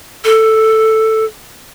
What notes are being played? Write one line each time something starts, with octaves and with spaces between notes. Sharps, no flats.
A4